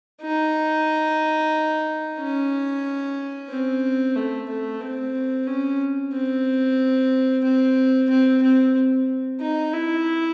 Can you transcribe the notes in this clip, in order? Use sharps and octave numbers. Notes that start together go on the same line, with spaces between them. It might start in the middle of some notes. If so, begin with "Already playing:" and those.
D#4
C#4
C4
A3
A3
C4
C#4
C4
C4
C4
C4
D#4
E4